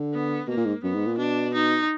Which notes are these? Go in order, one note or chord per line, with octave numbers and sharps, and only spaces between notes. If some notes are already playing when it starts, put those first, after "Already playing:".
Already playing: D3
B3
B2 A#3
A#2
G#2
F#2 B3
G#2
A#2
B2 D4
D#4